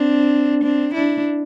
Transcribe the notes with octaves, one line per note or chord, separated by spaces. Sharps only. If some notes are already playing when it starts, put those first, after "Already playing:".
Already playing: C4 D4
C4 D4
D4 E4